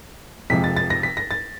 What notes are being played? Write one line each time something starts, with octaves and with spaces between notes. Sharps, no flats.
F2 C3 F3 G#3 B6
A6
A6
A#6
B6
A#6
A6